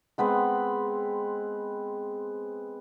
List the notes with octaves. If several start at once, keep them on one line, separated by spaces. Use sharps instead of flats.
G#3 B3 C4 B4